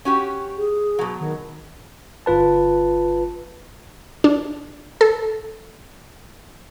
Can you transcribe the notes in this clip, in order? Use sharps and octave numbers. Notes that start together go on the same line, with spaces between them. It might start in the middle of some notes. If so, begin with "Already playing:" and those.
C#4 F#4 G4
G#4
B2 F#3
D#3
G1 F4 B4 A5
D4
A4